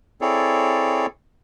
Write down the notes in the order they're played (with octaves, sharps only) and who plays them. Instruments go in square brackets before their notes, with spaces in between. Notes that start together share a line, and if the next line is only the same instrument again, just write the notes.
[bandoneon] C4 E4 G#4 A4 C#5 D5